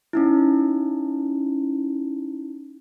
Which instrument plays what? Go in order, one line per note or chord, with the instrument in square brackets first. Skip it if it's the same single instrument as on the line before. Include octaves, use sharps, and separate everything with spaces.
[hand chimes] C#4 D#4 E4